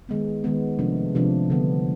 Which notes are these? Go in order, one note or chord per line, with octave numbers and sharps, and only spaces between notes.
D#3 G#3 B3
D#3 G#3 B3
C3 F3 A3 D4
C3 F3 A3 D4
D3 G3 B3